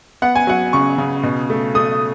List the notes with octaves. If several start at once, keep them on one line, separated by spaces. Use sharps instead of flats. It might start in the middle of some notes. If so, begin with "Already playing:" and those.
B3 F#5
G#5
F#3 F#5
C#3 C#6
C#3
B2
A3
A3 D#6